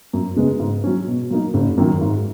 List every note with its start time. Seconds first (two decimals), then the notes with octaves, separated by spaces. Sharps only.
0.13 F#2
0.37 C#3 G#3 B3
0.60 G#2
0.84 F#3 C#4
1.07 B2
1.30 F#3 A#3 D#4
1.54 F#1
1.78 F#2 D#3 F#3
2.01 G#2